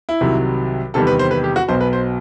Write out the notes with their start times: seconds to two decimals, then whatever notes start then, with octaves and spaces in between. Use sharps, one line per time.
0.09 E4
0.21 C2 C3 D#3 F#3
0.94 E2 C3 D#3 G3 A4
1.07 B4
1.19 C5
1.31 B4
1.44 G4
1.56 F#4
1.68 B1 B2 F#3 C5
1.81 B4
1.93 C5